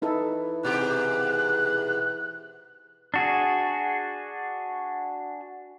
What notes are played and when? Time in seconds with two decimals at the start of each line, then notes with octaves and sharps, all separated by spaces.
0.02 E3 D#4 E4 A4
0.63 G#2 B2 G4 F#6
3.14 D4 F#4 G#4